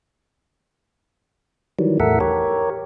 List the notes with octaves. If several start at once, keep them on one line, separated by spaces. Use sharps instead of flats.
D#3 E3 F#3 G3
E2 A2 A4 A#4 E5 F#5
G4 A#4 C#5